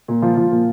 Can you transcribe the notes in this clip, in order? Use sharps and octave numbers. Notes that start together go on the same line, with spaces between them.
A#2
F3 F4
F3
A#2